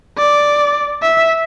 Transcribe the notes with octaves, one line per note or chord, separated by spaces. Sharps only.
D5
E5